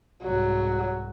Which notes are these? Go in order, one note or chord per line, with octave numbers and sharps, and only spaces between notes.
C2 G#2 F#3